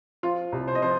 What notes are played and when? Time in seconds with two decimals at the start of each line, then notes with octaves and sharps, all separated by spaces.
0.23 F3 F4
0.52 C2
0.68 C5
0.75 D#5
0.82 F3 C5